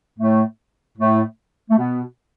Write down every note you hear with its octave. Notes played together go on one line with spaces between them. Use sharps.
A2 A3
A2 A3
A3
B2 B3